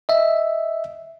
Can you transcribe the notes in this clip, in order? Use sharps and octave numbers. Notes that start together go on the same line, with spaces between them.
D#5 E5